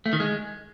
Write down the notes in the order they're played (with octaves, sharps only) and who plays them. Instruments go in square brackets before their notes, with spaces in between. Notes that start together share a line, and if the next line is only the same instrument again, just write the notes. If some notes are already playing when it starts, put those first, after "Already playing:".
[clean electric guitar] A3
D#3
G#3